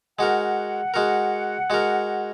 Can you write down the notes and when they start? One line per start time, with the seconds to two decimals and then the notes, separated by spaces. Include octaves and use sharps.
0.19 G#3 F#4 A#4 F#5
0.94 G#3 F#4 A#4
1.70 G#3 F#4 A#4